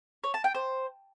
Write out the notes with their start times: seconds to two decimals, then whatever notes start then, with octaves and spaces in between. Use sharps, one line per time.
0.24 C#5
0.34 A5
0.44 G5
0.55 C5